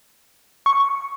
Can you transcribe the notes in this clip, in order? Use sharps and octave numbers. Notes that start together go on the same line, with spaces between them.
C#6